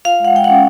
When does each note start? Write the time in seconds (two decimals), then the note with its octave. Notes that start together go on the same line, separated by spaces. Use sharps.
0.05 F4 F5
0.20 G#3 F#5
0.34 G#3 G5
0.44 C#4 F#5